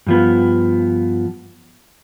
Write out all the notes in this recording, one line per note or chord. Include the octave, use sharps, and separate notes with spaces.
G2 F3 B3